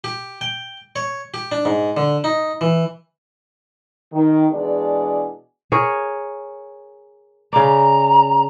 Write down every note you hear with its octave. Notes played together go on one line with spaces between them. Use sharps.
G4
G5
C#5
G4
D4
G#2
D3
D#4
E3
D#3
B2 E3 G#3 D4 G#4 D5
G#4 A#4 C#5
C#3 D5 A#5